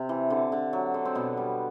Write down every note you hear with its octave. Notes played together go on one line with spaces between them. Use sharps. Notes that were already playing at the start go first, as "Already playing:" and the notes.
Already playing: C3
E3
D3
D3
F#3
D3
C4
B2 B3
G3